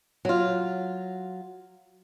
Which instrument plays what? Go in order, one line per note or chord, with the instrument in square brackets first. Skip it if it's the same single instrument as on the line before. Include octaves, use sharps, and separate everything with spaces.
[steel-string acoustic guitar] F#3 F4